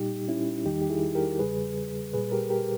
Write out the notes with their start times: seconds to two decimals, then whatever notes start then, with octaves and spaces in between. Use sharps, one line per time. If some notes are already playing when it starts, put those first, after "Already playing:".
Already playing: A#2 G3 D#4 G4
0.28 C#4 E4
0.65 E2 D#3 G3 D#4 G4
0.82 G4
0.90 E4 G#4
1.15 G4 A#4
1.39 E2 C#3 G3 G#4 B4
2.13 A#2 G3 G#4 B4
2.32 G4 A#4
2.50 G4 A#4